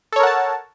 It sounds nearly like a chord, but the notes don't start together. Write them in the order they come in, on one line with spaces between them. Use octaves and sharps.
A4 C#5 A#4 F#5 A5